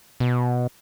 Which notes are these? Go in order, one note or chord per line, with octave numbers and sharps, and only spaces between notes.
B2